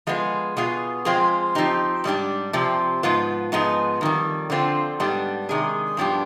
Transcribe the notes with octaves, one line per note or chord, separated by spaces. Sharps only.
F3 G#3 B3 F4 G#4
B2 B3 F4 G#4
F3 G#3 C4 F4 G#4
F3 C4 D#4 G4
G#2 G3 D4 G4
C3 F3 C4 G4
G#2 F3 B3 F4
G#2 F3 B3 D#4 G#4
F2 D#3 G3
D3 F3 C4 F4
G#2 G3 B3 D4 G4
C3 D#3 G#3 D4 G#4
G2 F3 B3 D4 G4